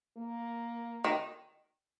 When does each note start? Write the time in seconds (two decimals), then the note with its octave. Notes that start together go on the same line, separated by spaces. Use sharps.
0.17 A#3
1.04 D#3